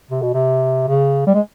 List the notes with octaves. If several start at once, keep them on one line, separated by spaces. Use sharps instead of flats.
C3
B2
C3
C#3
G3
G#3